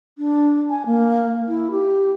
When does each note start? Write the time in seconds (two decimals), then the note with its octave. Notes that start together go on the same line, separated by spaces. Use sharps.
0.18 D4
0.70 G#5
0.86 A#3
1.48 E4
1.71 G4